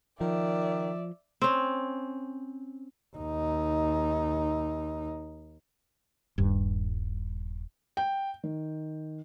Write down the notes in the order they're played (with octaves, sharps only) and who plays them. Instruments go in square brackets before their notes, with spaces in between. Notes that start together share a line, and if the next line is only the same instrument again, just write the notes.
[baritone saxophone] D#3 [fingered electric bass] F3 [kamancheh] D5 E5
[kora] C4 C#4
[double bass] D#2 D#4
[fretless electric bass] D#1 G2
[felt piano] G5
D#3